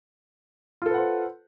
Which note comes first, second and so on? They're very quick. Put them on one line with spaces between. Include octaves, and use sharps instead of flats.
F4 A4 B4 F#5 C5